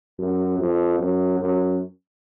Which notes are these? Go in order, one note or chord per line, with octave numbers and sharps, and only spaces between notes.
F#2
F2
F#2
F#2